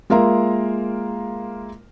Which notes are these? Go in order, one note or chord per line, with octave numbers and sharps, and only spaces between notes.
G#3 A#3 F4 A#4 E5 A#5